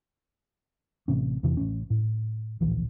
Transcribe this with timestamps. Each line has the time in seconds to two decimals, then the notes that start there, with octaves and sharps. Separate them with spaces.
1.08 A1 C3 C#4
1.43 E2 C3 E3
1.57 A1 C#4
1.90 A2
2.61 D1 A#1 E3